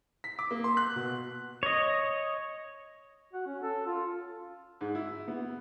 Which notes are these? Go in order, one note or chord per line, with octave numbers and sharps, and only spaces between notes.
B6
D6
A#3
C6
F#6
B2
C#5 D#5
F#4
C#4
A4
F4
G#2
E4
B3